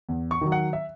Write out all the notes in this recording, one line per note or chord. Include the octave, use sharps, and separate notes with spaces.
E2
C#6
D#3 F#3
F#5
E5